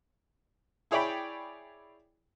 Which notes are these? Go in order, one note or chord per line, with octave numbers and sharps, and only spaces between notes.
E4 G#4 C#5 D5 G5 B5